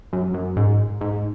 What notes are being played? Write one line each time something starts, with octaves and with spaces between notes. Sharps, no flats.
F#2
F#2
G#2
G#2